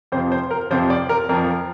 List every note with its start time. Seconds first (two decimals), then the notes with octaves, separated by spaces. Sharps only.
0.12 F2 C3 F3 C5
0.32 C5
0.51 A#4
0.71 F2 C3 F3 C5
0.90 D5
1.09 A#4
1.29 F2 F3 A#4